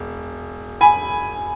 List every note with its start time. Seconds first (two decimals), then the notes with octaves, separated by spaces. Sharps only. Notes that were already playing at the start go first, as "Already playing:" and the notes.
Already playing: E1
0.81 G#5 B5